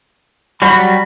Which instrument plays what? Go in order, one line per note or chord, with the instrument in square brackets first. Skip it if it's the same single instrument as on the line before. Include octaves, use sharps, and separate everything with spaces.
[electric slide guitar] F#3 G3 [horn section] B5